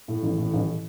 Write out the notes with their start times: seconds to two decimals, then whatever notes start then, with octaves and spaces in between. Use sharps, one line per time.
0.08 A2
0.23 A1
0.38 A2
0.54 A1